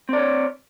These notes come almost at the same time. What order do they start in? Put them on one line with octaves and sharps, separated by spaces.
C4 D5 C#5